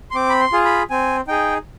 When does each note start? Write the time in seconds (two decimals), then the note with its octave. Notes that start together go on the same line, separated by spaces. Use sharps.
0.11 C6
0.15 C4 D6
0.30 B5
0.41 C6
0.52 F4 G#4
0.65 B5
0.90 C4 G#5
1.27 D#4 G#4 G5